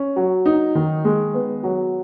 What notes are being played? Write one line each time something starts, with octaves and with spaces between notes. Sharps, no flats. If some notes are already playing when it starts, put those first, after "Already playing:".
Already playing: C#4
F#3
D#4
D#3
G#3
B3
F#3